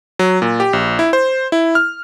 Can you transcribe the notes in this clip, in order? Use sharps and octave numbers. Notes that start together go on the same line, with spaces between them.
F#3
A#2
G4
A#1
E4
C5
E4
F6